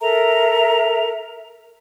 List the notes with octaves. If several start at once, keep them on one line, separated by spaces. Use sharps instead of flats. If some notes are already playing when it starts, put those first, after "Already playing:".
A4 A#4 E5 A#5